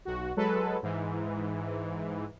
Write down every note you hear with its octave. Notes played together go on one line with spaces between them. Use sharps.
B1 F#4
F#3 G#3 A4 B4
G#2 E3